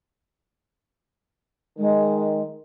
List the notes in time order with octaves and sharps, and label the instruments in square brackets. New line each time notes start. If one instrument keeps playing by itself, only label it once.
[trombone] D#3 [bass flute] G#3